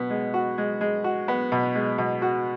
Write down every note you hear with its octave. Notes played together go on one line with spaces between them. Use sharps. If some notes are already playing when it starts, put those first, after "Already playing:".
Already playing: B2 B3
G#3
F#4
G#3
G#3
F#4
B3
B2
G#3
B2
F#4